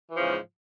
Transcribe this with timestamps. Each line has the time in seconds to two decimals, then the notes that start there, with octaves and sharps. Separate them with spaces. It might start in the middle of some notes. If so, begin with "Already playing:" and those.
0.09 E3
0.14 F3
0.18 C#3
0.23 G#2